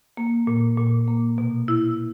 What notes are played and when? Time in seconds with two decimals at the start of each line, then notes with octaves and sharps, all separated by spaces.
0.17 A#3
0.47 A#2
0.77 A#2
1.08 A#3
1.38 B2
1.68 E4